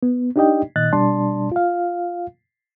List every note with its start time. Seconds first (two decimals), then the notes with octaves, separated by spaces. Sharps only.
0.03 B3
0.36 D4 D#4 G4 D5 D#5 G5
0.76 A#2 D#3 D#5 F#6 A6
0.93 B2 G3 D4 D5 A5 C6
1.52 F4 F5